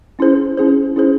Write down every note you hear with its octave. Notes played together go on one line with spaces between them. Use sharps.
C#4 E4 G#4 C5
C#4 E4 G#4 C5
C#4 E4 G#4 C5